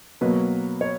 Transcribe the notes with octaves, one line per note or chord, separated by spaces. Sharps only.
B2 F#3 A#3 B4
C#5